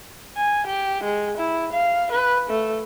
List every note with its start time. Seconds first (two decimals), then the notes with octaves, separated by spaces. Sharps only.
0.37 G#5
0.67 G4
1.03 G#3
1.38 E4
1.73 F5
2.12 B4
2.49 A3